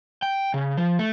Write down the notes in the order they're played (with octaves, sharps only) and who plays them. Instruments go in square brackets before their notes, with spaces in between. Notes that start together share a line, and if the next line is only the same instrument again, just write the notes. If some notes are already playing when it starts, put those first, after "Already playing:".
[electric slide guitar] G5
C#3
F3
A3